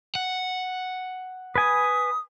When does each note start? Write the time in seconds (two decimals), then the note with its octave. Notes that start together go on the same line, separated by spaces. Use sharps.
0.15 F#5
1.56 B4 G#5 D#6